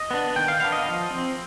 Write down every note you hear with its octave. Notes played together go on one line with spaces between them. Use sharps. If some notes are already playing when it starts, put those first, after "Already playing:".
Already playing: D#5
B3 D4
D#3 G5
F5
B3 D4 F5
D#5
F3
C4